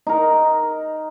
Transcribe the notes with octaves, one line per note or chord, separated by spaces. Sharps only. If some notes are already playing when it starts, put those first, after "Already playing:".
D#4 A#4